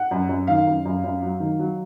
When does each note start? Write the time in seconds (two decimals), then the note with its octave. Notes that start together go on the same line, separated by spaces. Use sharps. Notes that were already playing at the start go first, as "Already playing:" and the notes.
Already playing: F#5
0.11 F#2
0.29 F#2
0.47 D#3 F5
0.67 F#2
0.85 F#2
1.04 F#2
1.22 F#3
1.40 D#3
1.59 F#3